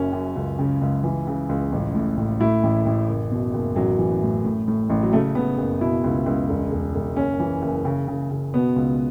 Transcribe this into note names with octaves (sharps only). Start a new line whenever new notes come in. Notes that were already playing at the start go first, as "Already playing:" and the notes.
Already playing: F#1 F#2 C#4
F#2
C#2
C#3
C#2
E3
C#3
C#2
A1
A2
A1
A2 E4
A1
A1
F#1
B2
F#1
A1 F#3
E3
A2
A2
A2
A1
F#3
C#3 A3
C#3 B3
F#1
B2 E4
C#2
C#2
E1
E1
E1
F#1 C#4
E3
F#1
C#3
C#3
C#3
B2 B3
C#2